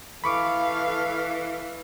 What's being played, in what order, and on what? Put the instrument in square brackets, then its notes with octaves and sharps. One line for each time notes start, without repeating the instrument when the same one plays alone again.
[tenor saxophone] E3 [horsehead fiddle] A4 F5 [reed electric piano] B5 C#6 D6